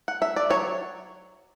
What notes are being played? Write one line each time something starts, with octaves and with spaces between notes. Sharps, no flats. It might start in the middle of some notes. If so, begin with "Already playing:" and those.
F#5
E5
D5
F#3 C#5